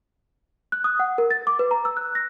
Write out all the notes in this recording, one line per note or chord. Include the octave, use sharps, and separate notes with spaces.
F#6
D#6
F#5
A#4
A6
D6
B4
A#5
E6
F#6
A#6